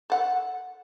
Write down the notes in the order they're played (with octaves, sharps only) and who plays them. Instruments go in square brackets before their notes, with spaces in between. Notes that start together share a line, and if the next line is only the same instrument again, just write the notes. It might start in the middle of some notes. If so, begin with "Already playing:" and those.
[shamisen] A4 F#5